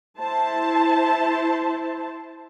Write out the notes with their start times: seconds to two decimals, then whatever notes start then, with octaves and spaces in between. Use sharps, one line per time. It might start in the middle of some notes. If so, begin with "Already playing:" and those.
0.19 E4 C5 A5